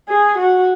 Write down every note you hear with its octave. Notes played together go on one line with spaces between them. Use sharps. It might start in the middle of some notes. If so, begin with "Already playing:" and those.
G#4
F#4